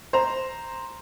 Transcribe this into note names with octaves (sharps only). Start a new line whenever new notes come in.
C5 A#5